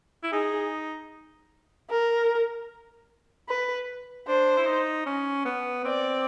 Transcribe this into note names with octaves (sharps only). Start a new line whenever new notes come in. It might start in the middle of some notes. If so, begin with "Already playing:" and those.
E4
D#4 G#4
A#4
B4
D4 C5
E4
D#4
C#4
B3
C4 D5